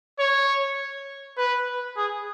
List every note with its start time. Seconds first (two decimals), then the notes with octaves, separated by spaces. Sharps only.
0.19 C#5
1.37 B4
1.96 G#4